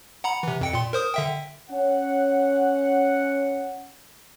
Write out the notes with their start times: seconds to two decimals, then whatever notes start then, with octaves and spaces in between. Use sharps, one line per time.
0.24 F#5 A#5 B5
0.43 C3 E3
0.61 F2 G5 C#7
0.73 A#2 C6
0.93 A#4 C5 D#6
1.14 D3 E5 G5
1.70 C#4 F#5